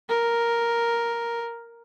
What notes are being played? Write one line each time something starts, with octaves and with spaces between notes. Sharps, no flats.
A#4